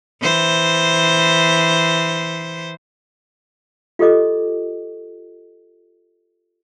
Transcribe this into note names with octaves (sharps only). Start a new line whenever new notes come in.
E3 C5
F4 G4 A4 D#5 D6